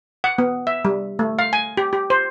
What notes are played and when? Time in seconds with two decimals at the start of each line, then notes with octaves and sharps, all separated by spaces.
0.24 F#5
0.38 B3
0.67 E5
0.85 G3
1.19 A3
1.39 F5
1.53 G#5
1.77 G4
1.93 G4
2.10 C5